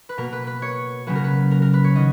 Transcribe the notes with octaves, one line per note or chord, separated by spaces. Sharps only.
B4
B2 A#3 A#4
B4
B4
C#5
C#3 F#3 A#3 B4
A#4
B4
A#4
A#4
B4
C#5
D#3 F#3 D#5